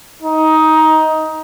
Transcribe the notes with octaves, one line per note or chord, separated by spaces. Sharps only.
D#4